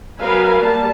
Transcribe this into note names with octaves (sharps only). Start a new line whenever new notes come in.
F#3 B3 A#4 B4 F5 G#5
G3 A#3 A5